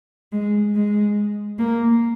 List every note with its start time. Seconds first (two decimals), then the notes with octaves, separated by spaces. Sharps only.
0.32 G#3
0.75 G#3
1.59 A#3